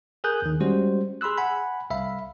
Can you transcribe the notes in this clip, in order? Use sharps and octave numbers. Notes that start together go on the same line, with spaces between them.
G#4 A#4 G#5 D#6 F#6 G6
D#2 D#3
G3 G#3 C#4 F#4 G4 C5
G#4 B5 C6 E6 F#6
F#5 G#5 B5
C2 E5 F5 B5